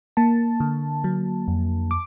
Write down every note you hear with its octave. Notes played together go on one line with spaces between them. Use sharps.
A#3 A5
D3
F#3
F2
D6